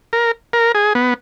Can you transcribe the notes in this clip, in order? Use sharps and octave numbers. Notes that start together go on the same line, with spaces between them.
A#4
A#4
G#4
B3